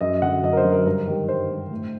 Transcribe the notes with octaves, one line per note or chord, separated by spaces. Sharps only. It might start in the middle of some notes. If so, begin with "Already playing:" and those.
F#2 D#5
D3 F#3 F#5
F#2 D#5
A#4
C5
D3 F#3
A#4
G2 A#4
D#3 G3
G2 C5
D#3 G3
A2